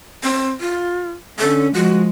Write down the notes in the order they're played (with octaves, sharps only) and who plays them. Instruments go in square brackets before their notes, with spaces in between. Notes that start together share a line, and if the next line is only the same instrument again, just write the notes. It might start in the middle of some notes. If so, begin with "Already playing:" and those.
[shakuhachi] C4
F4
[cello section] D3 C#4 [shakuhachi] A4
[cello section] F3 G#3 [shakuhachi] F#4